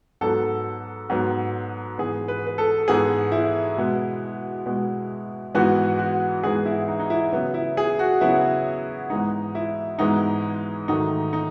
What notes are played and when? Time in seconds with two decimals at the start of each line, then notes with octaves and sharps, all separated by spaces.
0.21 G#2 F#3 B3 A4
1.10 G#2 F#3 B3
1.98 G#2 E3 B3 G#4
2.28 B4
2.47 B4
2.58 A4
2.88 G#2 E3 B3 G#4
3.32 E4
3.77 B2 G#3 B3
4.66 B2 G#3 B3
5.55 G#2 E3 G#3 B3 F#4
5.99 F#4
6.43 G#2 E3 G#3 B3 G#4
6.66 E4
6.88 D#4
7.00 D#4
7.10 E4
7.33 C#3 F#3 B3
7.54 E4
7.77 G#4
7.99 F#4
8.21 C#3 F#3 B3 E4
9.10 G#2 E3 G#3 B3 D#4
9.55 E4
9.99 G#2 E3 G#3 B3 D#4
10.88 G#2 D#3 F#3 A3 D#4
11.33 D#4